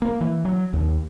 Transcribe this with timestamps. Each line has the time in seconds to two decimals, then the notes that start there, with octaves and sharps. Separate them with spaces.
0.02 A#3
0.21 E3
0.45 F#3
0.73 D#2